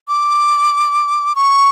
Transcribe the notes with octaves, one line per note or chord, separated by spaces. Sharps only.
D6
C#6